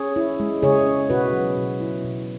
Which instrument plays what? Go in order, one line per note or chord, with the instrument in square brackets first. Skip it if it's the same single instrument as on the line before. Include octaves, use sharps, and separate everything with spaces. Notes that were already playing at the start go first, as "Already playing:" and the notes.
Already playing: [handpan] C#4 G#4 C#5
E4
G#3
C#3 G#4 C#5
C#4
B2 F#4 B4
F#3
B2
E4
B2